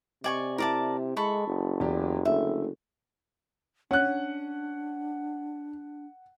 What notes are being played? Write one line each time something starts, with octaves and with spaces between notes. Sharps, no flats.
C3 D5 D#5 G#5 C#6
E4 A#4 D5 A5
G#3 A4 B5 C#6
F#1
E2 G4 D5
D3 A3 E5
C#4 D4 F#5 F#6